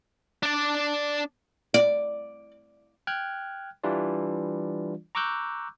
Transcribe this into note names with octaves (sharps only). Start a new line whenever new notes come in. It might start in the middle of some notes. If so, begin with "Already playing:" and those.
D4 D5
D5
G5 F6 F#6 G#6
E3 G3 D4 F4 D5
A#5 C#6 D6 E6 F#6 G6